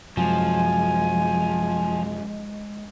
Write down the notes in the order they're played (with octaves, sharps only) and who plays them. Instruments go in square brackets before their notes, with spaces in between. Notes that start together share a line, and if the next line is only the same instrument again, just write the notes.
[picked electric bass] F#2 C3 F#3 [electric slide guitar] F3 [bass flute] G#3 [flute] G#5